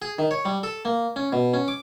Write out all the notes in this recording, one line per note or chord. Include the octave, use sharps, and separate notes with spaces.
G#4
D#3
C#5
G3
A4
A#3
C#4
B2
C#4
D6